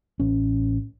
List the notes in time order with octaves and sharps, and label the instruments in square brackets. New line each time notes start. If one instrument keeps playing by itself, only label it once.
[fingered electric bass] A1 C#4